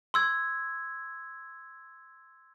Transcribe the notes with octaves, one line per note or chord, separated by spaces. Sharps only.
C6 E6 G#6